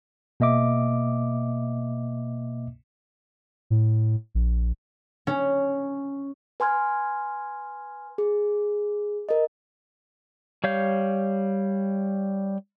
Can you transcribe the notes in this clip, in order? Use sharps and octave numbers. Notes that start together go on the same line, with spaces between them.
B2 A#3 D#5 E5 D6
A2
A#1
C#4
B4 G#5 C6 F6 G#6
G#4
A#4 D#5
G3 C#5 F5 G6